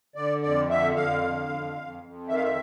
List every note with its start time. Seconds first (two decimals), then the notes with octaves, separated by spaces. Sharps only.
0.15 D3 D5
0.42 F2 D5
0.69 D3 E5
0.96 F2 F5
1.23 D3
1.49 F2
1.75 F2
2.03 F2
2.28 D#3 E5
2.36 F5
2.43 E5